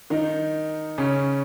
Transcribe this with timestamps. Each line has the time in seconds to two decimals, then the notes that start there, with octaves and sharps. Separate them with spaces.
0.10 D#3 D#4
0.98 C#3 C#4